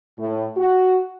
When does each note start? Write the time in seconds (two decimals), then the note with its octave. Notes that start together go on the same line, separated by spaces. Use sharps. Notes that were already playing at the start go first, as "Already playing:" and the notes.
0.18 A2
0.56 F#4